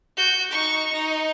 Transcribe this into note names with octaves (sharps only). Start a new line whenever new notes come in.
F#4 G6
D#4 C#6
D#4